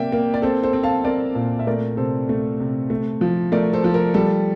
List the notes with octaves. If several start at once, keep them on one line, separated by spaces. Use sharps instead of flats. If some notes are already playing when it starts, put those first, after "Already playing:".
Already playing: C3 A#3 D5 E5 G5
A#3
D5
C4 A4 C5
A4 C5
C4
F5 A5
C4 A#4 D5
A#2
E5
A3 A#4 D5
C3 A4 C5
A3
C3
A3
F3
A3 A#4 D5
A4 C5
F3
A#4
G3 A4